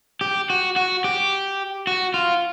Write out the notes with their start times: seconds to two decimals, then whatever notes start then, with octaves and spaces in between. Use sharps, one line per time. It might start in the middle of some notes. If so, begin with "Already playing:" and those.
0.21 G4
0.50 F#4
0.76 F#4
1.04 G4
1.87 F#4
2.14 F4